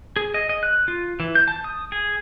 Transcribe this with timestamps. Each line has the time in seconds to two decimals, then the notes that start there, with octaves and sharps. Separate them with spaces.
0.16 G#4
0.34 D#5
0.49 D#5
0.63 F#6
0.88 F4
1.20 E3
1.35 G6
1.48 A5
1.64 D#6
1.92 G#4